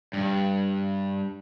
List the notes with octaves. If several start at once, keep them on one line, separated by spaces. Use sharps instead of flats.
G2